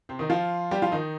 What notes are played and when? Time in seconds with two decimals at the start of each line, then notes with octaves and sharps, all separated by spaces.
0.09 C3 C4
0.19 D#3 D#4
0.30 F3 F4
0.71 G3 G4
0.82 F3 F4
0.92 D#3 D#4